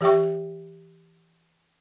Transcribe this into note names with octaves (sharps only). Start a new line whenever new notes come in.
E3 G4 E5 G5 C#6